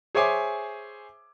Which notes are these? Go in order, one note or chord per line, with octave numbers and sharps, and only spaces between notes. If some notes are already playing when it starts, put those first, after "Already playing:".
G#4 C5 C#5 E5 G#5 D6